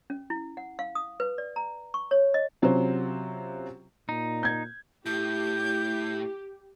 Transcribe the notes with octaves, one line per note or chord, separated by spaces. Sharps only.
C#4
E4
F#5
F5
D#6
B4
D5
A#5
C#6
C#5
D#5
C3 F#3 C4 C#4 F4 C5
A#2 D#4
G6 G#6
A2 E4 G4 G6